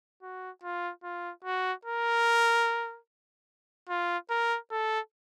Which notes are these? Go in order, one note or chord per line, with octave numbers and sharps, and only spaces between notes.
F#4
F4
F4
F#4
A#4
F4
A#4
A4